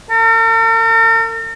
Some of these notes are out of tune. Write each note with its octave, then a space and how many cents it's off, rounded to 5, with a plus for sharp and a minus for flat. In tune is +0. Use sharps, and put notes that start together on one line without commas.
A#4 -45